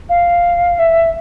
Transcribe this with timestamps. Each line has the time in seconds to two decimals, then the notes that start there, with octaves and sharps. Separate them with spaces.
0.09 F5
0.79 E5